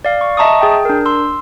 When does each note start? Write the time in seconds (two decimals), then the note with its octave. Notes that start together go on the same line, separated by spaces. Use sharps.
0.05 D5 F5
0.21 C#6
0.37 D#5 E5 A5 A#5 C#6 D#6
0.61 G#4 G5
0.85 D4 A#4
1.05 C6 E6